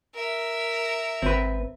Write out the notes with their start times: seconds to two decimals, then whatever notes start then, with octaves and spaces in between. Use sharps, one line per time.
0.15 A#4 E5
1.22 G#1 C4 B4